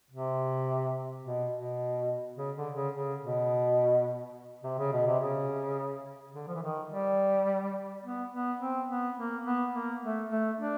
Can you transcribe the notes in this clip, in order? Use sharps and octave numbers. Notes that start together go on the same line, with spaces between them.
C3
B2
B2
C#3
D3
C#3
C#3
B2
C3
C#3
B2
C3
C#3
D3
F3
E3
D#3
G3
B3
B3
C4
B3
A#3
B3
A#3
A3
A3
D4